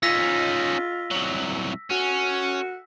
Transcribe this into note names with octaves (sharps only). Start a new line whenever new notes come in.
C#4 D#4 F4 E6 A#6 B6
C2 F#3
C#4 F#4